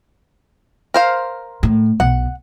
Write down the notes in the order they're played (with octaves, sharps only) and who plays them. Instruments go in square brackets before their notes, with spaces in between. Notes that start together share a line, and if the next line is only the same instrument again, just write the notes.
[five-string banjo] A#4 C5 F5
[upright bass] A2
[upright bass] B1 B2 [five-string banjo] F#5